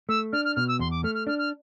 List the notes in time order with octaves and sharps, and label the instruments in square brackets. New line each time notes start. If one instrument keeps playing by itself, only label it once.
[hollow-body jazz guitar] A3 [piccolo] E6
[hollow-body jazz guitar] D4 [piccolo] F6
[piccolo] F6
[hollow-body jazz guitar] B2 [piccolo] F6
[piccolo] E6
[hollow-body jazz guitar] E2 [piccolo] C6
[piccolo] D6
[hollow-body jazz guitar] A3 [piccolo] F6
[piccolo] F6
[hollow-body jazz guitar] D4 [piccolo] F6
[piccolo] F6